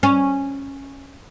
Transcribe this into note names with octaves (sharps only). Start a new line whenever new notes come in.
C#4